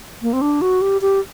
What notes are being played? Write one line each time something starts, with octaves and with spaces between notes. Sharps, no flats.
A#3
C4
D4
F#4
G4
G4